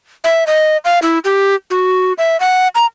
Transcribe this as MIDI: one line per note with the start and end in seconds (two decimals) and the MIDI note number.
0.24 0.44 76
0.47 0.77 75
0.85 0.99 77
1.02 1.19 64
1.25 1.55 67
1.70 2.13 66
2.18 2.39 76
2.40 2.68 78
2.75 2.86 82